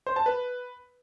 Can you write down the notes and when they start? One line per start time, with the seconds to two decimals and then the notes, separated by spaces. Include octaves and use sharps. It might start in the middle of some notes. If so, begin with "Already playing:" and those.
0.07 C5
0.16 A5
0.26 B4